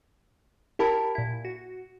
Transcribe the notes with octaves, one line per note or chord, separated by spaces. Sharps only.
E4 G4 A#4 G5 A5 B5
A#2 E4
F#4